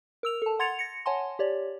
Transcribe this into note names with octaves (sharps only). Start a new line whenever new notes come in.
A#4 E6 F7
A4 A5
F#5 C6 G#6 A6 C#7 F7
A#6 C#7
C#5 F#5 G#5 A5 C6
G4 C#5 D5